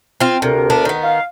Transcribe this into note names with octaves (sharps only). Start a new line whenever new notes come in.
C4 F4
D2 C3 A#4
B3 D4
D#3 B3
F5